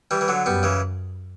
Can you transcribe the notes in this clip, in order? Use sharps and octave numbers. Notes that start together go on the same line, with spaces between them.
E3 G3
E3
D3 F#3
F#2 G3 B3
C#3 E3